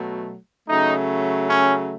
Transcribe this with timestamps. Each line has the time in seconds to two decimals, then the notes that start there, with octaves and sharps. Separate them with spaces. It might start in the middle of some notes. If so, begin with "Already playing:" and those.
Already playing: B2 F#3 A3
0.68 C#3 F#3 A3 D#4
1.50 C#4